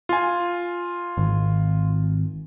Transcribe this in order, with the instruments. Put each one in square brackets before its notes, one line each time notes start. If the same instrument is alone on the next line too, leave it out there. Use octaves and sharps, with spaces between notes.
[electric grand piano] F4 G#5
[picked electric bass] G#1